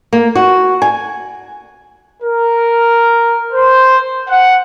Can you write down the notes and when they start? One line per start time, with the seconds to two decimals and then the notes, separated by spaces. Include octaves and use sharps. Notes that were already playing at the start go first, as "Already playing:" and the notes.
0.13 A#3
0.35 F#4
0.82 G#5
2.23 A#4
3.53 C5
4.29 F#5